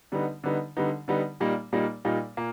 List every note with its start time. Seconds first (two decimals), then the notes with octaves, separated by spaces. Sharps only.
0.12 D3 G3 B3 D#4
0.44 D3 G3 B3 D#4
0.77 D3 G3 B3 D#4
1.08 D3 G3 B3 D#4
1.40 A#2 G3 A#3 D#4
1.73 A#2 G3 A#3 D#4
2.05 A#2 G3 A#3 D#4
2.37 A#2 A#3